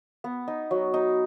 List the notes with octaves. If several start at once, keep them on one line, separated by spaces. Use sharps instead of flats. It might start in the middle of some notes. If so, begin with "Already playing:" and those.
B3
D#4
F#3
D#4